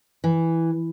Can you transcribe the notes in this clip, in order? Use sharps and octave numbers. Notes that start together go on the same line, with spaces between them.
E3